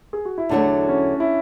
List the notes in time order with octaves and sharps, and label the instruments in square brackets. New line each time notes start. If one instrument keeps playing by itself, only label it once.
[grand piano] G#4
F#4
E4
[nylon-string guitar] E2 D3 F#3 A3 [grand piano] D4
[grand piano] C#4
E4